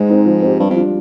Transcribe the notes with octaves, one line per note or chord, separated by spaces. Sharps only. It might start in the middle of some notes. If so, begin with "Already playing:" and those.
Already playing: G#2 G#3
C4 D#4
F3
C4 G4
G2 G3
F2
D4 F4